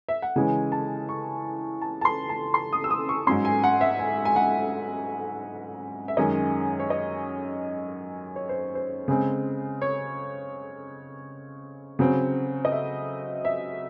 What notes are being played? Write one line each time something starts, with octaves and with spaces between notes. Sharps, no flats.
E5
F#5
C#3 E3 G#3 C#4 G#5
A5
C#6
A5
A5
C6
A5
C6
D#6
E6
D#6
C#6
G#2 F#3 C#4 C6
G#5
F#5
E5
G#5
G#5
F#5
E5
F#2 D#3 G#3 C#4 D#5
C#5
D#5
C#5
C5
C5
C#3 G#3 C4
C#5
C#3 F#3 C4
D#5
E5
E5